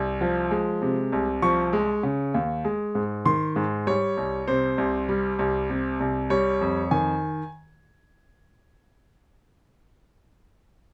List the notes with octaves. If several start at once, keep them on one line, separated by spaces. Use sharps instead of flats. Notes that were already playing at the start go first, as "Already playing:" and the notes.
Already playing: C2
F3
G#3
C3
C2
F3 C#6
G#3
C#3
D#2
G#3
G#2
D#3 C6
G#2
G3 C#5
C2
C3 C5
C2
G3
C2
C3
C2
G3 C#5
F2
D#3 G#5